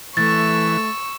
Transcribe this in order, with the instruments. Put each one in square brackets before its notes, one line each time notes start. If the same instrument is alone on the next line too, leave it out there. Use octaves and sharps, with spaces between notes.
[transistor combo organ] E3 [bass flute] A3 [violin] C#6 E6 [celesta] A6